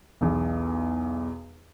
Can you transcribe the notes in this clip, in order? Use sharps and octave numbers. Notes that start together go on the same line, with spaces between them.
B1 E2